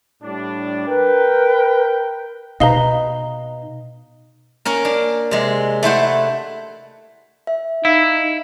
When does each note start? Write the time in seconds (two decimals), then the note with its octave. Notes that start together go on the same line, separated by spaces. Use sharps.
0.23 A2 G3 D4
0.88 A#4 B4 G5
2.60 B2 D#4 B4 D#5 F5 A#5 G7
4.65 A#3 C#4 A#4
4.85 D4
5.31 C3 G#3
5.83 A3 E4 C5 F#5
7.47 E5
7.85 D#4 E4 F5